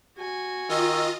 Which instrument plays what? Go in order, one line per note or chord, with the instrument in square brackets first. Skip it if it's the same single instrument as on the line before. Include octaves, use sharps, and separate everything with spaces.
[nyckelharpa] F#4 G#5
[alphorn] D#3 [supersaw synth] F4 D#5 [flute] E6